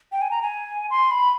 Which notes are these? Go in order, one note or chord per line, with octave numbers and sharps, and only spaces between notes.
G5
G#5
A#5
G#5
C6
B5